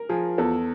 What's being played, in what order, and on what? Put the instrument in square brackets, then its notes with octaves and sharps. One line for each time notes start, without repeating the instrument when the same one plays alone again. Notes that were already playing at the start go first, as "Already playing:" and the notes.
Already playing: [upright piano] A#4
[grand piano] F3 [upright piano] G#4
[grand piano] E2 [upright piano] A4